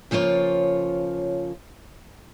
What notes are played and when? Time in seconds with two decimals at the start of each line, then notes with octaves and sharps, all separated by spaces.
0.11 C#3 F3 A#3 F4 C#5